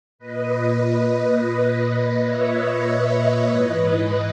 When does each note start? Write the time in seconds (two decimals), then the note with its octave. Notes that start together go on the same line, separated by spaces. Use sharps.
0.19 A#2 B4 D#5
1.82 B4 D#5
2.23 C#5 E5
2.64 B4 D#5
3.46 G#2 E3